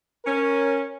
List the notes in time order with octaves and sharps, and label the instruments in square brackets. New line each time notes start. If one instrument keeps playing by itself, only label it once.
[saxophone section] C#4 [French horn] A#4